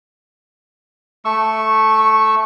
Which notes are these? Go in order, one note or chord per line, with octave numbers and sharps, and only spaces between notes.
A3 C#6 E6